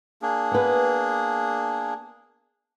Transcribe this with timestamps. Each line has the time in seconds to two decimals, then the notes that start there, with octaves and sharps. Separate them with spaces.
0.22 A#3 D4 G#4
0.52 B3 B4